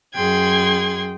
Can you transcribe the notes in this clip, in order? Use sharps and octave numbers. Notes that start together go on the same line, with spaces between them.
F#2 G#4 G5 C6 G#6